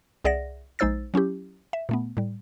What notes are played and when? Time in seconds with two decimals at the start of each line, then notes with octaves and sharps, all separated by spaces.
0.25 C2 G#4 D5 E5 F#5 A#6
0.79 A#1 G#3 D#4 C5 E6 A6
1.14 F#3 C#4 E4 G4
1.73 E5
1.89 A#2 A3 B3
2.17 A2 G3